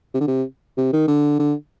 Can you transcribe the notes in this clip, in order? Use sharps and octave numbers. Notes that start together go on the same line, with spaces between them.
C3
D3
C3
C3
D#3
D3
D3